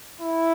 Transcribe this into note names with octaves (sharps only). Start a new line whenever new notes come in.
E4